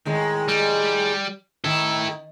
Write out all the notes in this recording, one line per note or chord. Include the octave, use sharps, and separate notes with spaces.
A2 D#3 G#3
G3
D#3 E4 A4